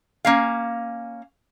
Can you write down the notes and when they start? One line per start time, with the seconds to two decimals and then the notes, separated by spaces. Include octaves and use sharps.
0.25 A#3 C#4 F5